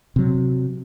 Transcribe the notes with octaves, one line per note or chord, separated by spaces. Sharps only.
C3 F#3